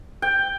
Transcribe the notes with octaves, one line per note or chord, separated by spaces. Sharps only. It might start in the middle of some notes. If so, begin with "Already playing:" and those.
G5